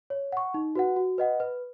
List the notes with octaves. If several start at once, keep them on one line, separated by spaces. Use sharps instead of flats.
C#5
F#5 C#6
D#4
F#4 B4 F#5
F#4
B4 D#5 F#5
B4